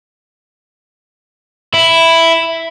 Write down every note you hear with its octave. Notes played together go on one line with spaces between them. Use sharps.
E4